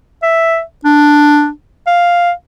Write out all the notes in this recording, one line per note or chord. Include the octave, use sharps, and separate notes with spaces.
E5
D4
F5